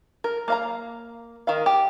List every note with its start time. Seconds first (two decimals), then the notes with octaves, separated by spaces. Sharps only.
0.24 A#4
0.48 A#3 F5 A#5
1.47 D#3 D#4 F5
1.66 G4